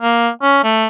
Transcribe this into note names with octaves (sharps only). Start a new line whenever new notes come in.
A#3
C#4
A3